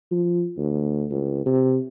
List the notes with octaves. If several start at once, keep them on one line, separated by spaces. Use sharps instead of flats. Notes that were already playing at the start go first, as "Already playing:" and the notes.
F3
D2
C#2
C3